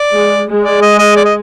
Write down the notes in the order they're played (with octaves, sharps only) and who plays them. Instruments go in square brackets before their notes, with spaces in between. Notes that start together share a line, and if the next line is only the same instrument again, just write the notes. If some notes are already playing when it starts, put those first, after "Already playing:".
Already playing: [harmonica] D5
[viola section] G#3
G#3
[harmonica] D5
D#5
D#5
D5
D#5